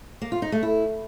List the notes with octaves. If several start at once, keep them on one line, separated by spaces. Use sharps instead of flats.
A#3
F4
D#4
A3
E4